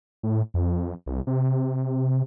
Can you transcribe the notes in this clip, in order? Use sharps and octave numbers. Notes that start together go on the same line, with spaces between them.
A2
F2
C2
C3